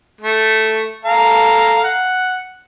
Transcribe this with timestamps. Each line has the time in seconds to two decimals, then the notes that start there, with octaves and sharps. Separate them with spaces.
0.21 A3
1.05 A4 F5 A#5
1.84 F#5